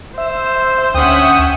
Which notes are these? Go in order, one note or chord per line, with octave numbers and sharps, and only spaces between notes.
C5 E5
D2 C#4 E5 F#5 G5 D#6